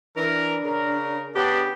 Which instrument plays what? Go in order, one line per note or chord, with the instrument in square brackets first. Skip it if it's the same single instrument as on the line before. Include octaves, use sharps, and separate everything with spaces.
[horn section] E3 A#4 [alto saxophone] D4
[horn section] C#3 A#4
[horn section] C#3 B3 D4 [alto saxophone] G4